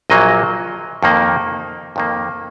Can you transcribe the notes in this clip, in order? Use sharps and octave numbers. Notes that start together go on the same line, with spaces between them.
A#1 A#2 F#3 A#3 D#5
F2 D#3 A#3
F2 D#3 A#3